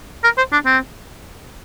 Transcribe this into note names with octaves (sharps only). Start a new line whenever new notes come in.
A#4
C5
D4
C4